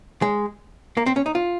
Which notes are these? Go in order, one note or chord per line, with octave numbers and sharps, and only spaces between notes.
G#3
A#3
C4
C#4
D#4
F4